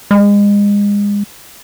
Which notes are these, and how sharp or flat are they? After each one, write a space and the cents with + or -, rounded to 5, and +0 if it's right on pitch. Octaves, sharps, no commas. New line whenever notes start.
G#3 -30